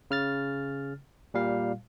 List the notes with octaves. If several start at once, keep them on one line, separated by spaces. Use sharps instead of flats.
C#3 F6 A6
A#2 G3 F5